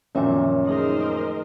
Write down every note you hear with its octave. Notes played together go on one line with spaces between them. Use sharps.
F#2 A#2 D#3 F3 C#4 F#4 A#4 E5
A3 D#4 G#4 A#4 C5 D#5